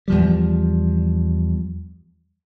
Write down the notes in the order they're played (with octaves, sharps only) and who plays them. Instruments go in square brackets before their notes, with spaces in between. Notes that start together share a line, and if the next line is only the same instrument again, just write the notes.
[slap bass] E2 F3 G3